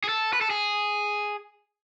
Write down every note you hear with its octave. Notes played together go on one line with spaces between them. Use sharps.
G#4
A4
B4
A4
G#4